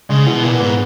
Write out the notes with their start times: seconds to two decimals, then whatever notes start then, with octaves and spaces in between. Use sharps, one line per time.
0.09 C#3 G#3
0.26 B2 E3
0.43 A#2 B3
0.59 G#2 B3